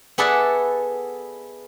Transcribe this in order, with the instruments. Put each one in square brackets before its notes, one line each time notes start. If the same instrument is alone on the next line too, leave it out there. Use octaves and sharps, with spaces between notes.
[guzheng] B3 G#4 A4 D5 E5 F#5